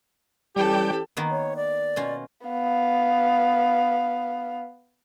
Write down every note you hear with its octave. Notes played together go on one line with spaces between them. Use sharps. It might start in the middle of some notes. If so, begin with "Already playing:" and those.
E3 G3 C#4 G4 A4 G5
D#3 A#3 B3
C#5
D5
B2 C#4 F4
B3 F5